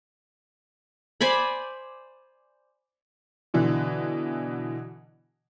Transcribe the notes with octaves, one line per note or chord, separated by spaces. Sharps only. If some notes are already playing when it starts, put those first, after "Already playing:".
C5 D5 G#5 B5
B2 D3 E3